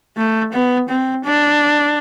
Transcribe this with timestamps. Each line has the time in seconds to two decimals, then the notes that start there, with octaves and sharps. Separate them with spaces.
0.17 A3
0.53 B3
0.89 C4
1.24 D4